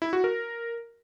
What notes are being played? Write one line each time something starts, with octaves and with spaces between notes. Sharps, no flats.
E4
F#4
A#4